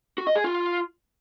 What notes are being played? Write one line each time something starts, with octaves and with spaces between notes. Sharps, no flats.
F#4
D#5
G#4
F4